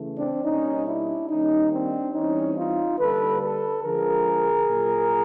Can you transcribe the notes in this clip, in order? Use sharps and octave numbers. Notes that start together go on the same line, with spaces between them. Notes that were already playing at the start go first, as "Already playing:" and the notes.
Already playing: C#3 E3 A3
C4 D4
B2 G3 A#3 C#4 D#4
D4 E4
D#3 G3 A#3 C#4 D#4
C4 D4
E3 G3 C4 C#4 D#4
D#4 F4
D3 G3 A#3 A4 B4
A4 B4
D3 F3 G#3 G#4 A#4
A#2 F#3 A#3